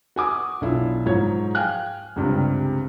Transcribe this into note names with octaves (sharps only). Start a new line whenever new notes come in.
F#4 G#5 D6 D#6
B1 D4 E4 F4
G#2 F3 F#3 C#5 G#6
F5 G5 G#5 F6 F#6
C#2 G2 C3